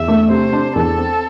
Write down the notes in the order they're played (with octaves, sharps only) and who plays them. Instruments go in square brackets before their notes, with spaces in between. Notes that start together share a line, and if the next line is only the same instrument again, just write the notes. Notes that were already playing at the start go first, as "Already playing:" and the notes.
Already playing: [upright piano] E2 [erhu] E5
[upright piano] A3
[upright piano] C3 [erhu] C5
[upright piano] D4
[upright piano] E2 [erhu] A4
[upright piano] C4